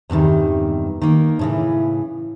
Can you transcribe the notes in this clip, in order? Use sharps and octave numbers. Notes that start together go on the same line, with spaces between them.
E2 G2 C3 D#3
D#3 A#3
A2 C#3 E3